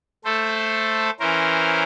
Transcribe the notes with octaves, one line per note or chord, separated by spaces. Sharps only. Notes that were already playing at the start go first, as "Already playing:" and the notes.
A3 A4 C5
E3 C#4 A#4 C5